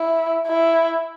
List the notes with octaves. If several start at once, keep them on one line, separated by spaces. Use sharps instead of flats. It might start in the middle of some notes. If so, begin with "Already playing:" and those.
Already playing: E4
E4